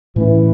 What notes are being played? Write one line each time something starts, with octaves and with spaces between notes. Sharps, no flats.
A2 E3 A3 C#4